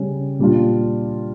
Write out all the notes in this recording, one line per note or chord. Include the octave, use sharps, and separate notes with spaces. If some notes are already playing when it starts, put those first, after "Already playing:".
Already playing: C#3 G3 C#4
A#2 G3 D4 F4